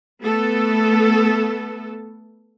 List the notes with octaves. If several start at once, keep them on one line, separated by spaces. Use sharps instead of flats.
A3 B3 A4